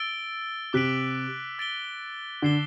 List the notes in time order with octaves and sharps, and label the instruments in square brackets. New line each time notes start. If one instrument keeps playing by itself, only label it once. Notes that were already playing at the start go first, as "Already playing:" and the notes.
Already playing: [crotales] E6 A6 D7 G7
[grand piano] C3 [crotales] D6 F#6 B6 D7 F#7
[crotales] E6 A6 D7 G7
[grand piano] D3 [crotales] D6 A6 C7 E7 G7